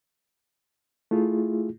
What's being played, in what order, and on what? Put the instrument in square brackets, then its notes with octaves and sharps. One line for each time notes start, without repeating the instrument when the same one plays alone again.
[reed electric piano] A3 E4 F4 G#4